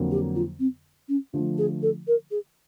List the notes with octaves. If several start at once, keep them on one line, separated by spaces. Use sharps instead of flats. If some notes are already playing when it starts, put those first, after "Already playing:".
Already playing: F2 D3 F#3 A#3
G4
F4
C4
C#4
D3 F3 A3 D4
G#4
A4
A#4
G#4